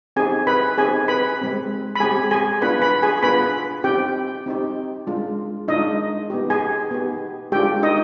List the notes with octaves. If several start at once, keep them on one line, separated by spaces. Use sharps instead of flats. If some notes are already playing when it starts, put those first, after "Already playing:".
C4 D#4 G4 G#4 G#5
B4 B5
C4 D#4 G4 G#4 G#5
B4 B5
G#3 C4 G4
B5
G#3 C4 G4 G#4 G#5
G#4 G#5
B3 D4 F4 B4 B5
B4 B5
G#4 G#5
B3 D4 F4 B4 B5
C4 D#4 G4 G5
C4 D#4 G4
G#3 D4 F4
G#3 D4 D#4 F4 D#5
B3 D#4 G4
G#4 G#5
B3 D#4 G4
G#3 D4 F4 G4 G5
D#4 D#5